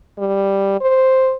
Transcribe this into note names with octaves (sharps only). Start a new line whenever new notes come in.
G3
C5